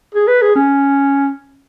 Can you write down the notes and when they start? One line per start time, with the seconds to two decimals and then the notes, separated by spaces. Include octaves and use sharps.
0.15 G#4
0.28 B4
0.42 G#4
0.55 C#4